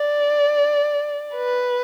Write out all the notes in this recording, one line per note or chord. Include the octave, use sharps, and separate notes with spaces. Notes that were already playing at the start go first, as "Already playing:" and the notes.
Already playing: D5
B4